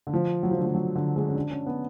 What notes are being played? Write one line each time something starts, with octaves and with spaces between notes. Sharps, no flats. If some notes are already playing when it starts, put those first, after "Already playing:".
D3
F3
F#3
F3
D3
F3
F#3
D3
G#3
C#4
D4
C#4
B3